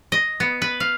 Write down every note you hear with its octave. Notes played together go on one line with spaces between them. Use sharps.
D#5
B3
B4
F5